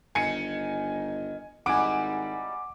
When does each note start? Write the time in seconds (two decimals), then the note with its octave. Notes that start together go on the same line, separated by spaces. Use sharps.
0.15 G1 D#3 D#4 G#5 C#7
1.66 G#1 G3 D#4 E4 F#5 G#5 D6 D7